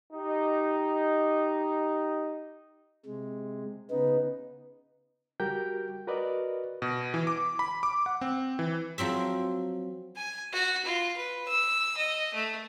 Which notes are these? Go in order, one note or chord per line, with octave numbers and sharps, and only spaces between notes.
D#4 G4
C3 G#3
C#3 B3 D#4 B4
G3 F#4 G4 A#4 G5 G6
F#4 A#4 B4 D5 D#5
B2
E3
D6
B5
D6
F#5
C4
E3
F3 F#3 C4 E5
G#5
F#4
F4
B4
E6
D#5
A3